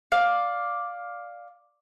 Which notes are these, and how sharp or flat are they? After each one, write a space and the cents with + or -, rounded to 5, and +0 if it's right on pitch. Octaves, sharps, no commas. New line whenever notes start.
D5 +0 F5 +10